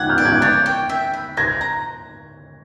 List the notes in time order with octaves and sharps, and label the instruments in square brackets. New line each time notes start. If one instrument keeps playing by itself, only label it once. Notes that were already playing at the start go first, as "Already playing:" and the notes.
Already playing: [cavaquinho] F#5 [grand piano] F#6 G#6
[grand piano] F6 G6
[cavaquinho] D5
[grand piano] F#6 G#6
[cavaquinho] C#5 [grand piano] G6 A6
[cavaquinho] G5
E5
B5
[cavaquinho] C5 [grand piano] G#6 A#6
[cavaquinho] A#5